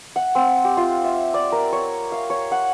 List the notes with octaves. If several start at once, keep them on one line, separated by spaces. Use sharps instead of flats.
F#5
C4
G4
F4
E5
D5
A#4
C#5
F5
C#5
F#5